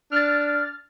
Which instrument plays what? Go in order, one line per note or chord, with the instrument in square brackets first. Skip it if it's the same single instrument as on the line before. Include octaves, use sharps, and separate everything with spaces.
[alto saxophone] D4 [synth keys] F6 A6